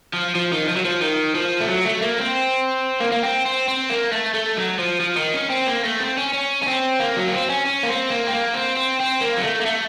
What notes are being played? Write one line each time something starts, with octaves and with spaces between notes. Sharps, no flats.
F3
F3
D#3
F3
F#3
F3
D#3
F3
A3
F#3
A3
A#3
C4
A#3
A#3
C4
C4
C4
A#3
A3
A3
F#3
F3
F3
D#3
C#4
C4
A#3
A3
C4
C#4
C#4
C#4
C4
A#3
F#3
A#3
C4
C#4
C#4
A#3
C4
A#3
C4
A#3
C4
C4
C4
A#3
F#3
A3
A#3
A3